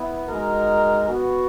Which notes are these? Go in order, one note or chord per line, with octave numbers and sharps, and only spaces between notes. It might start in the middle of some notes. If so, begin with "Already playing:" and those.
Already playing: B3 E4
G#3 D#4 F#4 A#4
B3 F#4